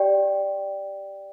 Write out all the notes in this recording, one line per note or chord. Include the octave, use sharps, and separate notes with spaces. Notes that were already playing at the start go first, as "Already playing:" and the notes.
Already playing: G4 D5 G5